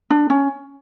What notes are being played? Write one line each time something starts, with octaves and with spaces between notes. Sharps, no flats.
D4
C#4